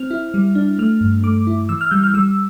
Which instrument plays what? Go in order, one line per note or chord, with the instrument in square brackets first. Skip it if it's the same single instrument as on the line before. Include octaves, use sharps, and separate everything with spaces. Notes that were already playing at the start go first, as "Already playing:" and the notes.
Already playing: [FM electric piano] C4 F6
E4
G3
D4
A3 F6
G2
A3 D6
E4
E3 E6
F6
G3 G6
F6
G3 E6